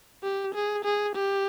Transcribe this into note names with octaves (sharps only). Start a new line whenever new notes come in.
G4
G#4
G#4
G4